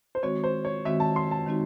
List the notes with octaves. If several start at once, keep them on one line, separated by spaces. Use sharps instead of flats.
C5
D#3 G#3 C4 F#4 C#5
C5
C#5
D#3 G#3 C4 F#4 E5
A5
C6
A5
D#3 G#3 C4 D#4 F#4